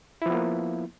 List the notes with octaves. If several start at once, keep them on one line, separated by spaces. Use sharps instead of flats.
F3 A#3 B3 E4